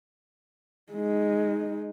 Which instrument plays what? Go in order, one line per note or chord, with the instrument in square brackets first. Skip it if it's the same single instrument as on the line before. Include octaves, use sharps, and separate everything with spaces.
[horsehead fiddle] G#3 D#4